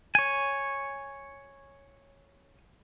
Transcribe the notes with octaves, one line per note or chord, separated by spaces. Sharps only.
C#5 G#5